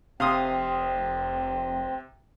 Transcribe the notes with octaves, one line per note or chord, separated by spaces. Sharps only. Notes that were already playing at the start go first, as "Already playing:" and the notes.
F1 C3 C4 F5 C6 D#6